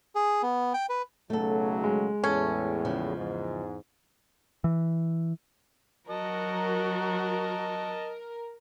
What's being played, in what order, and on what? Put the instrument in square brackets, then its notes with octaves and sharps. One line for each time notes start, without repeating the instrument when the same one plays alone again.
[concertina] G#4
B3
G5
B4
[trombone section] B1 C#3 F#3 [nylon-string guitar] A3 A4
[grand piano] G#3
[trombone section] E2 A2 [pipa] C#4 [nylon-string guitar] A4
[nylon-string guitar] C#3 F3
[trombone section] E2 G#2
[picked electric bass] E3
[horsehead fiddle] F#3 F#4 [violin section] A#4 [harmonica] D#5 A5